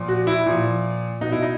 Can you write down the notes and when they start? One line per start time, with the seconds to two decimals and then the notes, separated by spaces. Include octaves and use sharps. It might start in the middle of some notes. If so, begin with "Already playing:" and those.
Already playing: A#2 F3
0.08 F#4
0.27 E4
0.46 A#2 F3
1.21 B2 D#4
1.32 E4
1.43 D#4